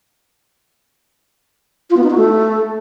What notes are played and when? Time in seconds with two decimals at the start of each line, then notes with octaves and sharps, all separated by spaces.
1.90 F4
1.97 B3
2.04 D#4
2.10 F#4
2.17 A3